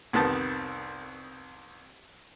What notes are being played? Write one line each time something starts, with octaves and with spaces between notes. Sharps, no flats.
C2 F2 D#3 B3 A5